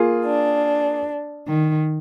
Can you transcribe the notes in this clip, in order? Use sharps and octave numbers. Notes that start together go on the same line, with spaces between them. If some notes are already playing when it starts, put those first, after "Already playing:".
Already playing: A#3 F4 G#4
D4
D#3